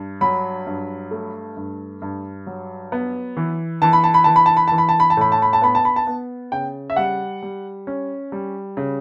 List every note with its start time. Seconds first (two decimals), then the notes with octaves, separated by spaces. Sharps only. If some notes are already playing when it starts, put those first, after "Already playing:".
Already playing: G2
0.21 F#3 B5
0.67 G2
1.11 A3
1.57 G2
2.02 G2
2.47 F#3
2.92 B3
3.37 E3
3.82 E3 A5
3.93 B5
4.04 A5
4.14 B5
4.24 E3 A5
4.36 B5
4.46 A5
4.57 B5
4.68 E3 A5
4.78 B5
4.89 A5
5.00 B5
5.10 A5
5.17 A2 B5
5.32 A5
5.42 B5
5.53 A5
5.62 B3 B5
5.75 A5
5.85 B5
5.96 A5
6.07 B3
6.52 C#3 G5
6.90 E5
6.96 G3 F#5
7.42 G3
7.87 C#4
8.32 G3
8.77 C#3